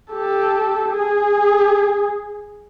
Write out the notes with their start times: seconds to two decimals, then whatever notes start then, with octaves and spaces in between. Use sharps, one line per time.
0.12 G4 A4
0.89 G#4